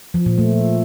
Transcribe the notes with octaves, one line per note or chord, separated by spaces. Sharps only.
F3
A#2
A3